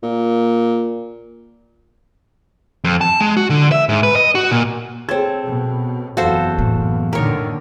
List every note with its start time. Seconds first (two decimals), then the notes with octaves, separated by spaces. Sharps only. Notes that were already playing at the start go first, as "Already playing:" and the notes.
0.03 A#2
2.84 F2
3.01 A5
3.21 G#3
3.37 F#4
3.50 D3
3.72 E5
3.89 G#2
4.03 B4
4.16 D#5
4.35 F#4
4.51 A#2
5.09 C4 G#4 A4 C#5 G#6
5.44 B2
6.17 F#1 E2 F#4 A4 C5 F5
6.58 A2 A#3
7.13 A#2 D3 D#3 A#4 C#5